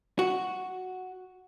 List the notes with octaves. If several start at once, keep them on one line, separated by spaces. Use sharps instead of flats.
F#4